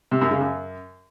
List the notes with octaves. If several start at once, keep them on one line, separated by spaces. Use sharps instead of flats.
C3
F#2
C#3
F#2